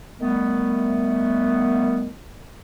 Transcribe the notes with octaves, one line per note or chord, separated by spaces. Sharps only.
D#3 G3 A3 B3